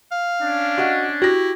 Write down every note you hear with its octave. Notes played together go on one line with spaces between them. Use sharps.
F5
C#4 D4
F#4 D#5 F#5
E4 F#4 G4 A#6